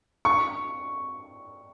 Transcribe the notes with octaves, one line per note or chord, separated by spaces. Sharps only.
C#6